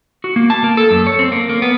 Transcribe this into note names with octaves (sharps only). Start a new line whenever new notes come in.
F#4
A#3
A5
A#3
A4
F#2
C#5
C4
A#3
A#3
B3